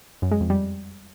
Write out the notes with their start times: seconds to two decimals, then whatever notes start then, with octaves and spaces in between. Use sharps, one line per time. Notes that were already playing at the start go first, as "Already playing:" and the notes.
0.22 F#2
0.31 G#3
0.41 F2
0.50 G3